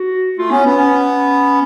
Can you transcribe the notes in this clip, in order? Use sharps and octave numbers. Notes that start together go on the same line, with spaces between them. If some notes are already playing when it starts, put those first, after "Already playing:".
Already playing: F#4
A3 F4
B3 C#4
B3 C#4
C#4